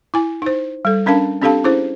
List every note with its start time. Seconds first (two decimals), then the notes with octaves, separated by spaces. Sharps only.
0.14 E4 G#5
0.42 D#4 C5
0.85 G3 A4
1.06 C#4 D4 A#4 F5 A5
1.42 C4 D4 G4 A4 F5 A5
1.64 C#4 E4 G#4 C5